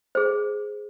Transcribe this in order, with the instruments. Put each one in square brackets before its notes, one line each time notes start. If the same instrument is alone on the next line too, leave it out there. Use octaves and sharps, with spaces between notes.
[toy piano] G#4 C5